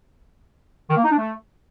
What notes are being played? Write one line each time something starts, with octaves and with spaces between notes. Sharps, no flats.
D#3
A#3
D#4
D4
A3